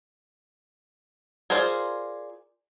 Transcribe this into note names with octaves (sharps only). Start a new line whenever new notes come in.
F4 G#4 A#4 C5 D5